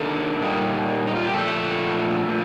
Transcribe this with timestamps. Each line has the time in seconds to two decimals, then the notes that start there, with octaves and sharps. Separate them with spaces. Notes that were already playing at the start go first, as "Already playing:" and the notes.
Already playing: D#3 A#3 D4 A4
0.40 A#2 G3 A#3 D#4
1.07 D#4
1.16 F4
1.25 G4
1.33 A#2 F3 A3 A4
2.28 A#2 F3